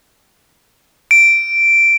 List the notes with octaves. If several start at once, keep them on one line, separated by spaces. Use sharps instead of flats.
D7